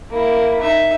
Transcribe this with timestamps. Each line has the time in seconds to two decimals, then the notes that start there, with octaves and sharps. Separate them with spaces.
0.10 A#3 E4
0.60 D#4 E5